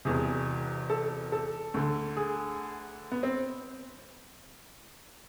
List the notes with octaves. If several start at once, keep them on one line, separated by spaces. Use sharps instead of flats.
E1 E2 C3 G#4
A4
A4
D2 D3
G#4
B3
C4